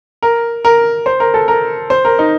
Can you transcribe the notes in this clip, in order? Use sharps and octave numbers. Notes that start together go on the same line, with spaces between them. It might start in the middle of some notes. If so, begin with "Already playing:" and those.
A#4
A#4
C5
A#4
A4
A#4
C5
A#4
D#4